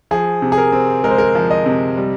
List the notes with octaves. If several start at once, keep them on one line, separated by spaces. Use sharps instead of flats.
F3 G#4
C3
G#4
A#4
C4
G#3 A#4
C5
A#4
F3
D#5
C3
G3